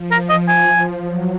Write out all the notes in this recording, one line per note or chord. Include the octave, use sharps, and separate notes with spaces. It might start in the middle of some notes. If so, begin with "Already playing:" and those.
Already playing: F3
A#4
D#5
G#5
F#3